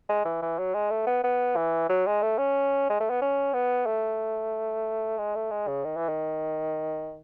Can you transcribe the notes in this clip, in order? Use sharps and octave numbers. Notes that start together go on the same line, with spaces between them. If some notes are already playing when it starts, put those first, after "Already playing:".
G#3
E3
E3
F#3
G#3
A3
B3
B3
E3
F#3
G#3
A3
C#4
G#3
A3
B3
C#4
B3
A3
G#3
A3
G#3
C#3
D#3
E3
D#3